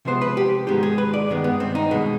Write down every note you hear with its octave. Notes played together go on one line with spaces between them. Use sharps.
C3 F3 G#3 B3 C5
B4
G4
G#2 D#3 G#3 B3 G4
G#4
B4
D5
G2 D#3 G#3 B3
B3
C4
D#4
B2 G#3 B3